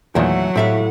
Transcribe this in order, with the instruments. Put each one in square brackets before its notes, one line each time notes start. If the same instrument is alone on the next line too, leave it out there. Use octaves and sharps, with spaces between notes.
[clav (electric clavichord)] E2 A#2 D#3 [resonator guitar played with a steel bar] E3 A3 [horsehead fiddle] F#3 F#5
[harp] A2 [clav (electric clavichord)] C4 A5 [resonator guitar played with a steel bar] G4 E5 F5